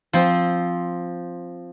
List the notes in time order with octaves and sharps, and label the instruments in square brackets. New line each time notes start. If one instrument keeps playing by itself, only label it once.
[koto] F3 C4